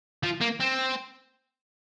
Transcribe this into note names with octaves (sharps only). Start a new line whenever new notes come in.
F3
A#3
C4